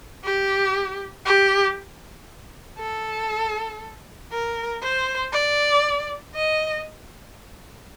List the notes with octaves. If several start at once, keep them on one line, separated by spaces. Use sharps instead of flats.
G4
G4
A4
A#4
C5
D5
D#5